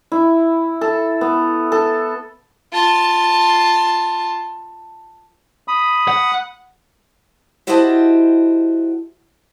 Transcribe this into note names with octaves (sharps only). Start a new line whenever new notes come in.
E4
A4
B3
A4
F4 A5
B5 D#6
F#5
E4 F#4 G4 C5 D#5 A5